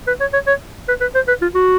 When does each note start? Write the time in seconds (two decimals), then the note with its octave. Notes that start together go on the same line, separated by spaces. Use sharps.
0.07 B4
0.20 C#5
0.33 C#5
0.47 C#5
0.88 B4
1.01 B4
1.15 C5
1.28 B4
1.42 F4
1.55 F#4